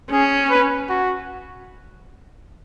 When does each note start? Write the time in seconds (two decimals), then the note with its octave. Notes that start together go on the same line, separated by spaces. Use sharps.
0.11 C#4 G#4
0.50 B4
0.89 F#4